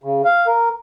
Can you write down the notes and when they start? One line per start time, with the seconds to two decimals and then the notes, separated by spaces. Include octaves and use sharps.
0.04 C#3
0.25 F5
0.47 A#4